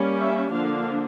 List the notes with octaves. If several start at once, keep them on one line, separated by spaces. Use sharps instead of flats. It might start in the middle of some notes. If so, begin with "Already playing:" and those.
Already playing: G3 A#3 C#4
E5
D3 F3 A#3 D4 F5